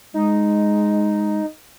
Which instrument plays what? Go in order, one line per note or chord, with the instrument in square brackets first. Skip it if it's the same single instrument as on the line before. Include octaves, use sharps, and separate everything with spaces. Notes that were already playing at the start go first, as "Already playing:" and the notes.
[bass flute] G#3 [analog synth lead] D#4